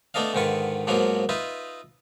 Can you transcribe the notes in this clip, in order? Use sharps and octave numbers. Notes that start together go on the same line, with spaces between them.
A3 B3 D4 A4 D#5 F5
G#2 D3 D#3 F4 B4 C#6
G#2 F3 F#3 A#3 B3 F#4
D#4 F4 B4 E5